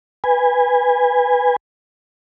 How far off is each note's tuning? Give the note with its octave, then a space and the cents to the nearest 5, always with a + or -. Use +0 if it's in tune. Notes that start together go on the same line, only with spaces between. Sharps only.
B4 +0 G#5 -20